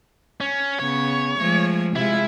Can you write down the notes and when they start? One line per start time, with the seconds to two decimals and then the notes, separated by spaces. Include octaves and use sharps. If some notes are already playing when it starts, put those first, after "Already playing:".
0.41 C#4
0.80 C#3 B3 C#5
1.37 F3 G#3 A3
1.96 C3 G#3 E4 F4